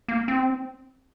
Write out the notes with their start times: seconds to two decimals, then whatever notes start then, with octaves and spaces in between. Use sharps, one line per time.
0.08 A#3
0.28 C4